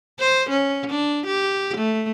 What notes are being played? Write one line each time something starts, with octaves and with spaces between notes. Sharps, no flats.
C5
C#4
D4
G4
A3